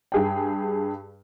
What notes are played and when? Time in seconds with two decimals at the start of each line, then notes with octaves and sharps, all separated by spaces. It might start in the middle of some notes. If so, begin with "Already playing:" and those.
0.12 G2 G#4 G5